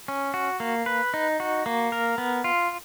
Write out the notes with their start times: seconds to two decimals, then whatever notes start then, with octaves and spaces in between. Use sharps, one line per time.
0.08 C#4
0.34 F#4
0.60 A#3
0.86 B4
1.14 D#4
1.40 F#4
1.66 A#3
1.92 A#4
2.18 B3
2.44 F4